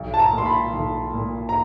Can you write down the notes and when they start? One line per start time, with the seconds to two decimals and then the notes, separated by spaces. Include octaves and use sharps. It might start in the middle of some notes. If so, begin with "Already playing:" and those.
Already playing: B1
0.14 A5
0.19 A#5
0.33 A#2
0.38 C6
0.45 B5
0.73 B1
1.14 A#2
1.49 A#5